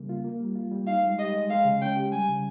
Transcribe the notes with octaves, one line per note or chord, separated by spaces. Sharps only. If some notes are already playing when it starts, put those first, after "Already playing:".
Already playing: C#3 G3 A#3
F4
A#3
G3
F4
G3
D#4 F5
G#3
G4 D#5
G#3
G#3 F5
C#3
C#4 G5
G4
G3 G#5
C#3